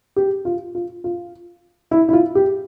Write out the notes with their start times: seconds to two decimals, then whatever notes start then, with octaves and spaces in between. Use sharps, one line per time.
0.16 G4
0.45 F4
0.75 F4
1.04 F4
1.91 E4
2.09 E4
2.13 F4
2.35 G4